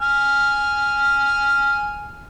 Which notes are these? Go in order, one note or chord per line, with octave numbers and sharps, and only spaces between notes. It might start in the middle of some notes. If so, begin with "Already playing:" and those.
G#5 F6